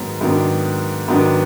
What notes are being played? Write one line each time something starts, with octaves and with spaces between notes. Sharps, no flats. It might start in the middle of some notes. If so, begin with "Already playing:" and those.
Already playing: G#2 D#3 F#3 B3
G#2 D#3 F#3 B3 D4
G#2 D#3 F#3 B3 D4